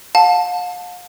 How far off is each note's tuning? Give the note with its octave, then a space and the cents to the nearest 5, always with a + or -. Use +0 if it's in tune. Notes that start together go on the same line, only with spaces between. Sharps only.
F5 +40 A5 +0